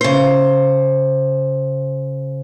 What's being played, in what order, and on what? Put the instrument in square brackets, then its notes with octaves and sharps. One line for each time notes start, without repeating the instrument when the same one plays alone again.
[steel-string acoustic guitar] C#3 C5